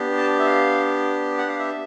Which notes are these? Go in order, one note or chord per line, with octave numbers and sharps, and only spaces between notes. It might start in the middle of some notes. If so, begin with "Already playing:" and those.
Already playing: B3 D4 G4
A5
E5
F5
F#5
F5
E5